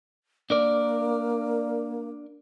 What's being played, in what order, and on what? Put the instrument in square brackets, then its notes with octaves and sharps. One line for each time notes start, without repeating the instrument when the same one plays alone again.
[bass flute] A#3 [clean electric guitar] D4 A#4 D5